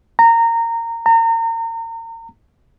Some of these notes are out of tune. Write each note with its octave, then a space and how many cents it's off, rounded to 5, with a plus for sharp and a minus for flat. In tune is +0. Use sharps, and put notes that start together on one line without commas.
A#5 -20
A#5 -35